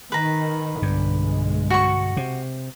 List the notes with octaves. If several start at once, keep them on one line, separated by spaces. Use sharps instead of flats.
D#3 B4 A#5
B1 G2 D3 G#3
F#4 C#6
C3